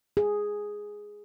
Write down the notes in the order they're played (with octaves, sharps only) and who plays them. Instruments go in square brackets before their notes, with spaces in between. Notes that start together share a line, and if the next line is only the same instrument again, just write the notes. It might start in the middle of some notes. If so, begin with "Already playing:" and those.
[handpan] G#4